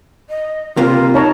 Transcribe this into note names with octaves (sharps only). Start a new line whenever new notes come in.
D#5
C3 A#3 F4
D#4 C#5 A5 A#5